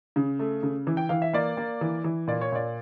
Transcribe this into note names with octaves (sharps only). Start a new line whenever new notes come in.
C#3
A3
C#3
E3
G5
E3 F5
E5
A#3 D5
A#3
E3
E3
A#2 D5
C#5
A#2 D5